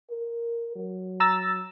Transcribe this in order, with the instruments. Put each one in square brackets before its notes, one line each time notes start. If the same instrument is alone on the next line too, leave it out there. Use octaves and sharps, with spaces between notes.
[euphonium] A#4
F#3
[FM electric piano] A#5 E6 A6